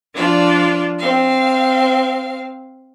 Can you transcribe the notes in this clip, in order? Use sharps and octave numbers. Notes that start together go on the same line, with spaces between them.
F3 D4 F4 D5
C4 F5